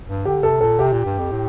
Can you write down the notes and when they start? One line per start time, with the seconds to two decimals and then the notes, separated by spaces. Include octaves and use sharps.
0.08 G2
0.25 D3 G4
0.43 C3 A4
0.60 A#2 A4
0.79 C3 G4
0.92 A#2
1.05 G2
1.19 F2
1.32 A2